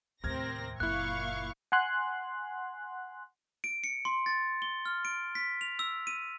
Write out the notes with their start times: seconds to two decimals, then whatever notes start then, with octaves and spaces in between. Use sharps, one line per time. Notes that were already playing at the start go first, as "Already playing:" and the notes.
0.23 D#2 A2 C3 C4 A#4 F6 G#6 A#6
0.80 F#1 F#2 A#2 A#3 E4 F5 C#6 F#6
1.72 F#5 G#5 C6 F#6
3.64 D7
3.84 C#7
4.05 C6
4.26 A6
4.62 G7
4.85 F6
5.05 D7
5.35 B6
5.61 F7
5.79 E6
6.07 D#7